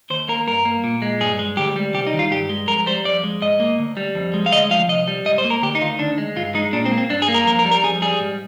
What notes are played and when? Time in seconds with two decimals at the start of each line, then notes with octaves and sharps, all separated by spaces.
0.10 D#2 C5
0.28 A#3 A#4
0.47 G2 A#4
0.65 A#3
0.84 A#2
1.02 G#3
1.20 G2 G#4
1.39 G#3
1.57 D2 G4
1.76 G3
1.94 C2 G4
2.07 D#4
2.13 D#3
2.19 F4
2.31 G2 G4
2.49 G#3
2.68 F2 A#4
2.86 G3 C5
3.05 F2 D5
3.24 G#3
3.42 G#2 D#5
3.60 A#3
3.79 D2
3.97 G3
4.15 F2
4.34 G#3
4.46 F5
4.52 D2 D#5
4.70 F3 F5
4.89 C2 D#5
5.08 G3
5.26 G#2 D#5
5.38 C5
5.44 A#3
5.50 A#4
5.62 D2 G4
5.75 D#4
5.81 D#3 F4
5.99 D2 D4
6.18 G#3
6.36 G2 F4
6.55 G#3 D#4
6.73 A#2 D4
6.85 C4
6.92 A#3
6.98 C4
7.10 G2 D4
7.22 G#4
7.28 A#3
7.34 A#4
7.47 F2 A#4
7.59 A#4
7.65 G3
7.71 A#4
7.84 F2 G#4
8.02 G3 G#4
8.20 G#2